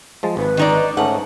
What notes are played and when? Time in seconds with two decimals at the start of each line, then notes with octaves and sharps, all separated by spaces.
0.23 F3 G#3 A5
0.37 G#1 B4
0.57 D#3 D#4 D5
0.97 G#2 A3 C#4 F#5 A5